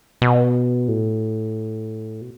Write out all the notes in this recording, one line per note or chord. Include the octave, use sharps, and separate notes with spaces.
B2
A2
B2